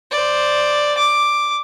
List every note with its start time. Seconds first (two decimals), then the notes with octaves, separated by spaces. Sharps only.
0.11 C5 D5
0.98 D6